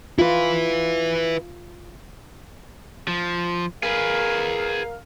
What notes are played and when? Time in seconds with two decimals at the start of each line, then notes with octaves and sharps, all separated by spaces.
0.19 E4 F4 B4
3.08 F3
3.83 G#4 A#4 B4 F5